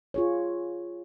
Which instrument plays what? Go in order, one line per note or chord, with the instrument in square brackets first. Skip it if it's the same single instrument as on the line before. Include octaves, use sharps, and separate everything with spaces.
[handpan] F4 G#4 C#5